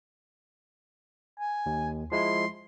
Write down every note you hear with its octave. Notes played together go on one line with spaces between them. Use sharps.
G#5
D#2
F3 G#3 E4 C6